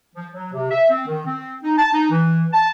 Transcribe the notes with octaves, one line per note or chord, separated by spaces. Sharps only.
F3
F#3
C3
E5
C4
D#3
C4
D#4
A5
D#4
E3
A5